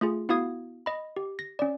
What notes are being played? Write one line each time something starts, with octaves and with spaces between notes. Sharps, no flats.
A3 F4 G#4
B3 E4 F#4 F5 D#6 G#6
D#5 B5
G4
A#6
C#4 D5